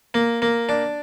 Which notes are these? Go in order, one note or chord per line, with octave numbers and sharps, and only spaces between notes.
A#3
A#3
D4